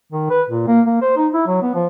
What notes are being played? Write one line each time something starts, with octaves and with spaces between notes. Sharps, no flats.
D#3
B4
A#2
A#3
A#3
C5
D#4
E4
F#3
B3
F3